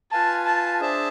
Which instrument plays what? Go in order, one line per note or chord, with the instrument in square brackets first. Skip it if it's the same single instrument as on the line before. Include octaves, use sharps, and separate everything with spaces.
[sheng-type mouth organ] F4 B4 F5 G#5 [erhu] A5
[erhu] A5
[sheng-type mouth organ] D4 G#4 C5 E5 A5